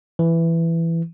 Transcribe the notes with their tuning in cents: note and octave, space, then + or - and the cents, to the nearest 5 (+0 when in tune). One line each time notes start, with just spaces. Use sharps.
E3 +10